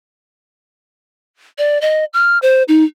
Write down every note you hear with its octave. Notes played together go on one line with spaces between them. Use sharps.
D5
D#5
F6
C5
D#4